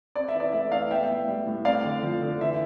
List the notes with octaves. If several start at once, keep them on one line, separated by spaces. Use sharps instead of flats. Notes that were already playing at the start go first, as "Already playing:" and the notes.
C4 D5
E5
E3
D5
A3 E5
E3 D5 F5
B3 E5 G5
A2
G3
A2
C4 D5 F5
D3
F3
D3
E3 E5